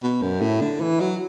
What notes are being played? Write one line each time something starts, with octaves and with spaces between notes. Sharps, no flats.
B2
F#2
A2
D3
E3
F#3